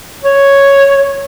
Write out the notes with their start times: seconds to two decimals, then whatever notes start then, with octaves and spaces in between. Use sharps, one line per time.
0.24 C#5